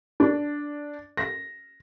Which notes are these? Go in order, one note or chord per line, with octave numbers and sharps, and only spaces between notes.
D4
A#6